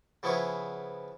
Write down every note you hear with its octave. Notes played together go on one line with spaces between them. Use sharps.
C#3 F3 B3 E4 G#4 C#5